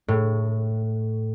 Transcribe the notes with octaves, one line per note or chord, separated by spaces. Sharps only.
A2